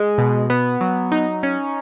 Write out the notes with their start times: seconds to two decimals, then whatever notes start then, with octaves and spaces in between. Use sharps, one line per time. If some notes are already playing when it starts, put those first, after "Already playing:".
Already playing: G#3
0.18 B2
0.50 B3
0.81 F#3
1.12 D#4
1.43 C#4